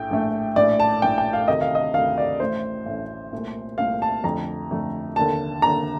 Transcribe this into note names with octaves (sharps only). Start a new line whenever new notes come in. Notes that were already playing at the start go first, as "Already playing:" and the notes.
Already playing: A#1 A2 A3 G5
A#1 A2 A3
A#1 A2 A3 D5
A5
A#1 A2 A3 G5
G5
F5
D2 C3 D#3 D#5
F5
D#5
D2 C3 D#3 F5
D5
A1 A2 A3 C5
A1 A2 A3
C2 A#2 A3
C2 A#2 A3 F5
A5
F2 D3 A3 A#5
F2 D3 A3
F1 D#2 D3 A5
F1 D#2 D3 A#5